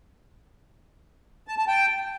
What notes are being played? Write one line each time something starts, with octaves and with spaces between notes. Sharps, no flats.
A5
A5
G5